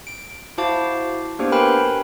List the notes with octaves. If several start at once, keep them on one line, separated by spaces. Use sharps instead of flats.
D7
E4 F#4 C5 F5 A5 D6
A#3 B3 D4 G4 C5
A#4 B4 G5 G#5 B5 C6